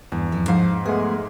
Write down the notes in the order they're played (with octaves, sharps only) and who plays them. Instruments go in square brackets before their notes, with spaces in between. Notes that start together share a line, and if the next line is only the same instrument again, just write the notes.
[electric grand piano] E2 [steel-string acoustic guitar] G2
[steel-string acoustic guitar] F2
[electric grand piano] G#2 [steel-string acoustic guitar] F3 C5 F5
[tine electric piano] G#3 A3 B3 [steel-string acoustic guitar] G#4